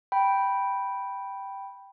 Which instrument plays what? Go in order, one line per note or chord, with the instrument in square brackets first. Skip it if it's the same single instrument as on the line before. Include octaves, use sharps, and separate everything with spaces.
[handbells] G5 B5